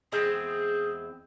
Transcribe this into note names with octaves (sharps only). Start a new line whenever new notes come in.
E2 G#3 C4 G#4